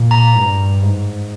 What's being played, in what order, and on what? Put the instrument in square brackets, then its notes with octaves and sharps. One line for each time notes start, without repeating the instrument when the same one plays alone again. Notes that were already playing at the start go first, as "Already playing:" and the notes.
Already playing: [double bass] A#2
[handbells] A#5
[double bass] G2
G#2